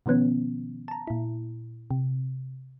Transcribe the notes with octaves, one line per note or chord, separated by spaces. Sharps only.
B2 D#3 F3 B3 C#4
A5 A#5
A#2 E4
C3